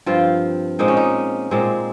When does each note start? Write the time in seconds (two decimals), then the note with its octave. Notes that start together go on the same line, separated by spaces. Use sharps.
0.06 G2 F3 C4 F4
0.79 A#2 G#3 C4 D#4
0.88 C#4
0.97 D#4
1.51 A#2 G#3 C4